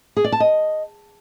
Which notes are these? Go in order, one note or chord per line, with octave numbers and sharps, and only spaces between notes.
G#4
D5
A5
D#5